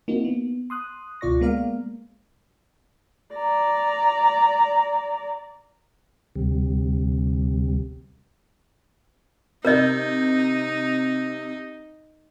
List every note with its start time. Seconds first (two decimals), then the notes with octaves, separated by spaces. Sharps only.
0.08 A#3 C4 D#4 E4 F#4
0.24 B3
0.70 C6 D#6 F#6
1.21 C#2 B2 F4 D5 C#6 A#6
1.41 G#3 A#3 B3 A#4 D5 F5
3.35 D5 A#5
6.36 D2 C3 G3
9.65 C3 D#4 A#4 D#5 G6